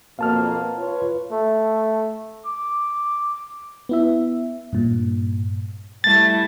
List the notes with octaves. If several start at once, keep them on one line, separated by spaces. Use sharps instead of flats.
F2 B2 A#3 F5 A5 F6
F4 B4 C#5
A3
D6
B3 E4 E5
G2 A#2
G3 A3 E4 A6